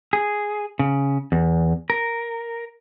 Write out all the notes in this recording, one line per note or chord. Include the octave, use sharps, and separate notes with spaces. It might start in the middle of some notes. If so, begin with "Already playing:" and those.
G#4
C#3
E2
A#4